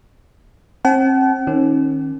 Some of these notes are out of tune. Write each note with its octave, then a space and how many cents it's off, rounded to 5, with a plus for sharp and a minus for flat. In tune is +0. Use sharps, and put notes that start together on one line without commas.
C4 +35 F#5 +45 A5 -40
D#3 +0 C#4 -35